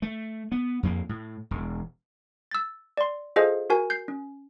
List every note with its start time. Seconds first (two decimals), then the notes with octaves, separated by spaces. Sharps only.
0.02 A3
0.52 B3
0.83 F2 A#3
1.09 A2
1.51 E1
2.51 E6 A6
2.97 D5 C6
3.36 F4 G#4 A4 C5 D#5 F5
3.70 F#4 A#4 G#5
3.90 G6 C7
4.08 C#4